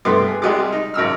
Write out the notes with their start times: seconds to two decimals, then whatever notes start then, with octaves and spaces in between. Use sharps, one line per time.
0.05 G2 A3 B3 C6 D6
0.28 G#4
0.42 C2 G3 G#3 D5 F#5 D6
0.72 D#4
0.94 G#1 F#2 E6 F6